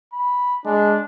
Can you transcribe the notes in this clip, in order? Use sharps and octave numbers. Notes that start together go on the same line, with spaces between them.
B5
G#3 D4